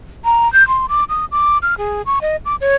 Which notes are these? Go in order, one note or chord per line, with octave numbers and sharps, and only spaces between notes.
A#5
G6
C6
D6
D#6
D6
F6
G#4
C#6
D#5
D6
C#5